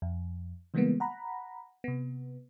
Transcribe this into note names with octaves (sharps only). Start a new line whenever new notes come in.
F2
C#3 E3 G3 G#3 A#3 B3
F#5 A#5 B5
C3 B3